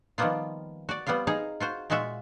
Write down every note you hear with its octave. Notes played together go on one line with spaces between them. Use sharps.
D#3 F3 G3 A#3 B3 F4
F#4 D5
G3 B3 C4 F4 F5
D#4 G#4 F5 A#5
F4 F#4 C5
A#2 G#3 F4 F#4 E5